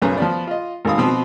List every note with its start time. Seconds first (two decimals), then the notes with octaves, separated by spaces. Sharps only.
0.02 B1 F#2 C#3 C#4 B4 A#5
0.18 F3 B3 D5
0.47 F4 D#5
0.85 G#1 D#3 A#3 F5 B5 D#6
0.98 B2 F3 B3 C4